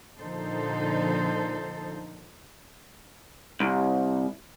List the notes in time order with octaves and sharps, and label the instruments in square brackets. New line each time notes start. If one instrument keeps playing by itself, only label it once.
[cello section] A#2 D3 F3 D#4 A4 C5
[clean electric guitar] C2